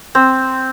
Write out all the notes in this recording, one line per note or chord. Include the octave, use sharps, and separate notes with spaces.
C4